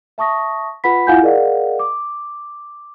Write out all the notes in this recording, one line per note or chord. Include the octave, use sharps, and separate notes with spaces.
E5 A5 C#6 D#6 A#6
F4 B4 F#5 B5 B6
E4 F4 F5 F#5 G#5 G6
G#4 A#4 D5 D#5 F5 F#5
D6